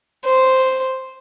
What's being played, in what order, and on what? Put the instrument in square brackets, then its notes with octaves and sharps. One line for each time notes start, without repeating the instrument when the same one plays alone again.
[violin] C5